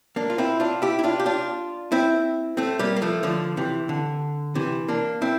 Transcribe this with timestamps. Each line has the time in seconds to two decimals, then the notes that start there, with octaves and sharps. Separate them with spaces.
0.16 A#3 D4
0.30 F4
0.38 C4 E4
0.60 D4 F4
0.82 E4 G4
0.99 E4
1.04 D4 F4
1.19 G4
1.26 D4 F4
1.92 C4 E4
2.57 A3 C4
2.79 G3 A#3
2.96 A#3
3.02 F3 A3
3.23 D3 F3
3.57 C3 E3
3.89 D3
4.55 C3 E3
4.88 A#3 D4
5.22 C4 E4